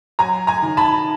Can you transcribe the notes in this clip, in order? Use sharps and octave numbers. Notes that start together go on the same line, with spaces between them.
F#3 G#5 A#5
G#5 A#5
D#3
A5 B5